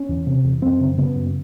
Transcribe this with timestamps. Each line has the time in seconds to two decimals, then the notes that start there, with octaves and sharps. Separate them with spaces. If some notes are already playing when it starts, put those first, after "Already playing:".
Already playing: C#4
0.09 E2
0.27 C3
0.44 E2
0.62 F#2 C4
0.80 C#3
0.97 C#3 B3
1.15 F#2